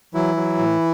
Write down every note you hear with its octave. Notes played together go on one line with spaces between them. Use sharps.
E3 F#3 E4
F#3
A2